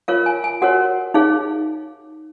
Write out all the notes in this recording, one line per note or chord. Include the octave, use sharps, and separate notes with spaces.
F4 A#4 C#5 F5
G#5
G#5
F#4 A#4 C#5 F#5
D#4 G#4 C#5 F5